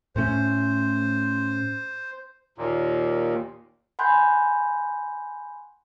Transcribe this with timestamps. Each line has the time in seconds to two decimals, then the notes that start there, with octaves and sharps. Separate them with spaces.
0.16 A2 A3 C#4 C5
2.58 D#2 A#2
3.99 F#5 G#5 B5 C6 F#6 G6